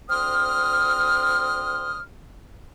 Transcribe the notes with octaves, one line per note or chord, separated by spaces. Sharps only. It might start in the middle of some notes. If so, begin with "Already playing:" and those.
D2 C4 C6 D#6 F6